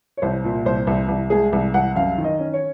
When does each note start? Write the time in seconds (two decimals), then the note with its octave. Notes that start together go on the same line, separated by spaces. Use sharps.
0.17 C#5
0.22 C2 C5
0.44 A#2
0.66 C2 C5
0.87 C2
1.08 C2
1.30 G#3 G#4
1.53 C2
1.74 C2 F#5
1.95 F#2 F5
2.18 D#3
2.24 D#5
2.39 C#4
2.54 C#5